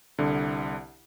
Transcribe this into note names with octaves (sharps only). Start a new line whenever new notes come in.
C2 D3